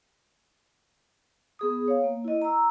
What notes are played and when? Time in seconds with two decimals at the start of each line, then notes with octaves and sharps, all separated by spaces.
1.59 B3 G#4 D#6
1.88 C#5 F5
2.04 A#3
2.24 E4 D#5
2.42 A#5 E6